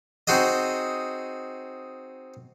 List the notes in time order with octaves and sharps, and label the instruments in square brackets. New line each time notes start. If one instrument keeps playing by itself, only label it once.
[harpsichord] C4 D#4 F#4 G#4 D#5